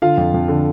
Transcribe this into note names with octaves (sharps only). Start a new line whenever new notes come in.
D3 F4 F5
F2
F2
D3